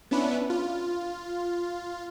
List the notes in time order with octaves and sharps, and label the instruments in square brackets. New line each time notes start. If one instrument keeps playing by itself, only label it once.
[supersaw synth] B3 C#4 D4 E4 B4
F4